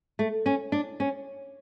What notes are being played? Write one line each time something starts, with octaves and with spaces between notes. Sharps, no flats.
A3
C#4
D4
C#4